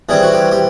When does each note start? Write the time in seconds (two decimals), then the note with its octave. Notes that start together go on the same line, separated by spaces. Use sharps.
0.09 E3 G3 C4 G#4
0.23 F#4
0.33 G4
0.51 G4